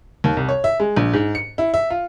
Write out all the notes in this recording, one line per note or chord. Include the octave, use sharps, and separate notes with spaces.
D#2
C2
C#5
E5
G#3
A#1
G#2
C#7
E4
E5
F4